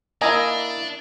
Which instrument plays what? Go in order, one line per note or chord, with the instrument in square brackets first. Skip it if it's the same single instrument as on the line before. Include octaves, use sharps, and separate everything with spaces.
[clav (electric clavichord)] A#3 E4 [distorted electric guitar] D4 [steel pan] D#5 G#5 A#5